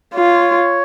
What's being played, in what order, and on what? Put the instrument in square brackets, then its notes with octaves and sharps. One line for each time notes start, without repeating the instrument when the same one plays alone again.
[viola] F4 [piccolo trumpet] C#5